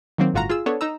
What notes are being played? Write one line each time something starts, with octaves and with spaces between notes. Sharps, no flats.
D#3 F#3 A#3 C4
G1 A2 F4 F#4 F5 A#5
F4 G#4 E6
B3 D4 A4 C#5
D#4 A#5 E6